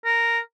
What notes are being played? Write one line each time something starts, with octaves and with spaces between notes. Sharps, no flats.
A#4